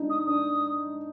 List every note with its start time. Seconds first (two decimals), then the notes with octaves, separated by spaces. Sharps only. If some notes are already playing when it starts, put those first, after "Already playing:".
Already playing: D4 D#4
0.10 D#6
0.27 D4 D#6